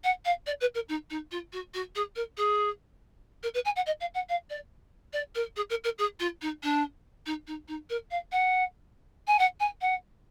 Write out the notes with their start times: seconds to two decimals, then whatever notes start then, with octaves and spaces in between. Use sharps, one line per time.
0.04 F#5
0.25 F5
0.47 D5
0.61 B4
0.75 A#4
0.89 D#4
1.10 D#4
1.31 F4
1.53 F#4
1.74 F#4
1.95 G#4
2.16 A#4
2.37 G#4
3.43 A#4
3.54 B4
3.65 G#5
3.76 F#5
3.86 D#5
4.01 F5
4.14 F#5
4.29 F5
4.50 D5
5.13 D5
5.35 A#4
5.56 G#4
5.70 A#4
5.84 A#4
5.98 G#4
6.20 F4
6.42 D#4
6.63 D4
7.26 D#4
7.47 D#4
7.68 D#4
7.90 A#4
8.11 F5
8.32 F#5
9.27 G#5
9.39 F#5
9.60 G#5
9.81 F#5